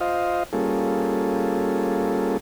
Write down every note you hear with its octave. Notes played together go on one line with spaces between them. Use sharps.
F4 C5 D#5 F5
G3 A#3 C#4 F4 G#4 A4